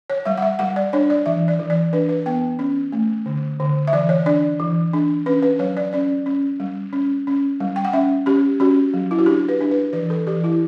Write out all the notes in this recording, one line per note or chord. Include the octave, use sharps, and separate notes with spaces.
C#5
G3 E5
F#5
E5
G3 F#5
D5
D4 C#5
D5
E3 E5
D5
E3
D5
D4 B4
B4
B3 G5
C#4
A3
D3
D3
E5
E3 D5
C#5
D4 D5
E3
D4
C#4 B4
B4
F#3 C#5
D5
C#4 D5
C#4
G3
C#4
C#4
G3
G5
F#5
C#4 E5
C#4 G4
C#4 F#4
F#3
E4
F#4
D4 G4
B4
D4
B4
E3 B4
A4
E3 G4
E4